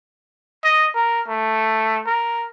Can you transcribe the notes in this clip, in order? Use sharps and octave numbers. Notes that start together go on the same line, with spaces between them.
D#5
A#4
A3
A#4